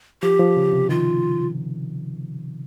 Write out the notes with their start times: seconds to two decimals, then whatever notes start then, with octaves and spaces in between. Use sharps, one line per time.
0.22 F3 G4
0.39 F3
0.57 C#3
0.73 C3
0.89 D#3 F4